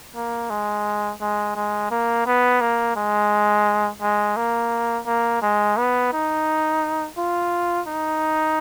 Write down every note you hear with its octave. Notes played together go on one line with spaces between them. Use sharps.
A#3
G#3
G#3
G#3
A#3
B3
A#3
G#3
G#3
A#3
A#3
G#3
B3
D#4
F4
D#4